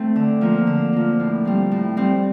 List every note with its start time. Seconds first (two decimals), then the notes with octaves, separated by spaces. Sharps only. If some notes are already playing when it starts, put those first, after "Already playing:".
Already playing: A3 C4
0.16 D3
0.41 F3 A#3
0.67 D3
0.93 F3 A#3
1.20 A2
1.45 G3 C4
1.71 A2
1.97 G3 C4